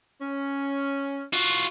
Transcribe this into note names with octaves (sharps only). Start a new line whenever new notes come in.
C#4
F4 F#4